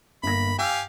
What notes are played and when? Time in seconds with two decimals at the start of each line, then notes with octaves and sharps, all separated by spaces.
0.23 G1 A#3 B5 A#6
0.59 G4 F5 G#5 E6